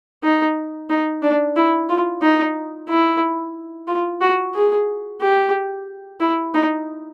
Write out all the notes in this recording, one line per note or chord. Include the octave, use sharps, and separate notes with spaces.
D#4
D#4
D4
E4
F4
D#4
E4
F4
F#4
G#4
G4
E4
D#4